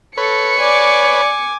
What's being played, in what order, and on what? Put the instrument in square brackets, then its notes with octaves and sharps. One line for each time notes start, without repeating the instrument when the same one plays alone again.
[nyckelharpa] A4 [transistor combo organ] B4 C#5 [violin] C#7
[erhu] D5 [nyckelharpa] G#5 D6